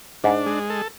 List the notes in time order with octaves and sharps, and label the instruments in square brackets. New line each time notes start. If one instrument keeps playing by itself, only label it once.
[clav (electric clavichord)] G#2 [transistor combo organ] D4
[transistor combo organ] G#3
A4